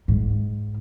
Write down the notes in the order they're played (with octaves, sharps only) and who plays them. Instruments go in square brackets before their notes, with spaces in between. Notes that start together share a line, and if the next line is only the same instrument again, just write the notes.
[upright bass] G#2